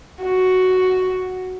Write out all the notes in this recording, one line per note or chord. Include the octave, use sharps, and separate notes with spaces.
F#4